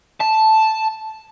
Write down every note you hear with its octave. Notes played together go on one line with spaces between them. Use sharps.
A5